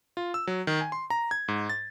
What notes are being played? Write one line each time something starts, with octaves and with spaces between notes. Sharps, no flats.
F4
E6
F#3
D#3
G#5
C6
A#5
G#6
G#2
A6